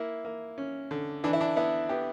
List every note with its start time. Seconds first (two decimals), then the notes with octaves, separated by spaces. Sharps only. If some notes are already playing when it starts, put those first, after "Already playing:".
Already playing: A#3 E4
0.25 A#3
0.58 C#4
0.91 D3
1.24 E3 D4
1.33 E4
1.41 D4
1.57 B3 E4
1.89 B3 G4